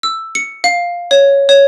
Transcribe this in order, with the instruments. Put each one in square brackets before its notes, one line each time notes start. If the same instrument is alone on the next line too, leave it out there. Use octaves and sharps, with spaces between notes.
[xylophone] E6
C#7
F5
C#5
C#5